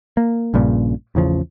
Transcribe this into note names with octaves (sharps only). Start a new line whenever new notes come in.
A#3
A#1 G2 A#2 C#3
A1 E2 C#3 F3